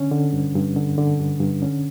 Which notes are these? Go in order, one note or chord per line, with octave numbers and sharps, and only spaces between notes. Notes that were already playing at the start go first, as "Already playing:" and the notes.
Already playing: D3 C#4
D3
G2
G2
D3
D3
G2
G2
D3 C#4